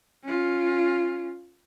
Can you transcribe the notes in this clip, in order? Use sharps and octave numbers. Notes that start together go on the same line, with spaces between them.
C#4 F4